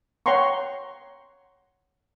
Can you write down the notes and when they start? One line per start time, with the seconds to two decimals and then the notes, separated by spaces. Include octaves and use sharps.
0.26 C#5 F#5 G5 A#5 C6 C#6